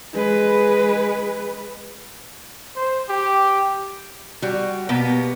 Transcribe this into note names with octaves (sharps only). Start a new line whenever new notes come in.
G#3 B4
C5
G4
G3 F#4
B2 A#3 B3 G4